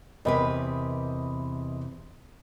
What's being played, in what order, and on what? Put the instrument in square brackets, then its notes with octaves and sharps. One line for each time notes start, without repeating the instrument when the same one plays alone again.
[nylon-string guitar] E2 C3 B4 [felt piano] A#4 D#5 B5